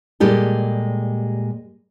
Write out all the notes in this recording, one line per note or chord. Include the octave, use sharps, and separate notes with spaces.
A#2 G3 G#3 G4 A4